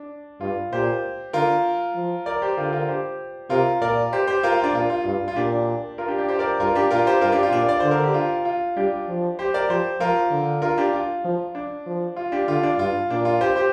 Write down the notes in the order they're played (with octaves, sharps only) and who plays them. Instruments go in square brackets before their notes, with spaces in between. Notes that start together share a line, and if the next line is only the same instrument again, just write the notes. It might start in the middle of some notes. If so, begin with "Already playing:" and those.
Already playing: [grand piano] D4
[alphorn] G2 [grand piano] F4
[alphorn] A#2 [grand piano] G4 C5
[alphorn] D3 [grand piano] F4 A#4
[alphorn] F3
[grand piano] A#4 D5
G4 C5
[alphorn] D3 [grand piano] F4 A#4
[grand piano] F4 A#4
G4 C5
[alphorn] C3 [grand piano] F4 A#4
[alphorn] A#2 [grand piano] A#4 D5
[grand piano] G4 C5
G4 C5
F4 A#4
F4
D4
[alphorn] A#2 [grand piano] F4
[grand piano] F4
[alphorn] G2 [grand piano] F4
[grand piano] F4
[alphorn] A#2 [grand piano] D4 G4
[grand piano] F4 A#4
D4 G4
D4 G4
G4 C5
A#4 D5
[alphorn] G2 [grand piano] F4 A#4
[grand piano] D4 G4
[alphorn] A#2 [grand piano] F4 A#4
[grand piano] G4 C5
[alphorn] G2 [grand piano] F4 A#4
[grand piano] D4 G4
F4
[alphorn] A#2 [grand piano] D4
[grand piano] D5
[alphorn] D3 [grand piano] C5
[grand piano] A#4
G4
F4
F4
[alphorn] G3 [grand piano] D4 G4
[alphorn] F3
[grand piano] G4 C5
A#4 D5
[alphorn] F3 [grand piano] G4 C5
[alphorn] F3 [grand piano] F4 A#4
[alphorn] D3
[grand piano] F4 A#4
D4 G4
F4
[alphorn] F3
[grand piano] D4
[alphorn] F3
[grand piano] F4
D4 G4
[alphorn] D3 [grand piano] F4
[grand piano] D4
[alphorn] G2 [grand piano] F4
[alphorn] A#2 [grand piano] D4
[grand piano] F4
G4 C5
G4 C5